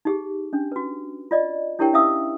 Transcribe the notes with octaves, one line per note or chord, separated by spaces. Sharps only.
D#4 G4 G#4
C#4 D4
F#4 B4
F4 D5 D#5
D4 E4 G4 A#4 C#5 G5
C#4 E4 E5 F5 D#6 E6